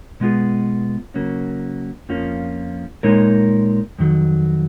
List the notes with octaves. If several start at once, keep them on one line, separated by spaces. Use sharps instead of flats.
B2 G#3 B3 F4 G#4
C#3 F#3 A#3 C#4
F2 F3 A#3 C#4 F4
A#2 G#3 D#4 A#4 C#5
F2 D#3 F#3